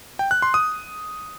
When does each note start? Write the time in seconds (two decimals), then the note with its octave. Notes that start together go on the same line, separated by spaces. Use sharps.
0.19 G5
0.31 F#6
0.42 C6
0.54 D#6